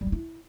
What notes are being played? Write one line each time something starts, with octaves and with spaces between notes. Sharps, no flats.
G3
F4
E4